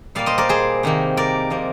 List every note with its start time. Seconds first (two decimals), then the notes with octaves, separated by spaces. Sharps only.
0.15 A#2 G3 A#3 D5 F5
0.26 C5 D#5
0.38 A#4 D5
0.49 G#4 C5
0.83 C3 D#3 A#3
1.17 A#4 D5
1.50 C3 F3 A#3